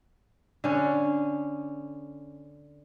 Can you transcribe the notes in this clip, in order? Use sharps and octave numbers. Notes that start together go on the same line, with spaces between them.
D3 C#4